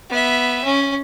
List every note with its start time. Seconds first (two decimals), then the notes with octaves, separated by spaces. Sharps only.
0.10 B3 E5
0.64 C#4